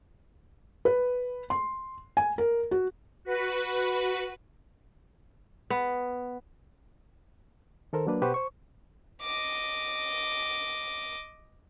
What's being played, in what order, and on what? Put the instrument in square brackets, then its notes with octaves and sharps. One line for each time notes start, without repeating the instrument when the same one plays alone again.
[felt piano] B4
C6
G#5
A#4
F#4
[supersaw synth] F#4 B4
[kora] B3
[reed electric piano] D#3 A4 A#4 C5
F#3 A#3 D4 B4
B2 G4 B4 C5 F#5 C#6
C5 C#6
[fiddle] D#5 D6